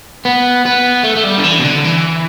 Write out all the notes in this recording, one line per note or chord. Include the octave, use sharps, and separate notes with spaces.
B3
B3
A3
A3
G3
D3
E3
B2
D3
E3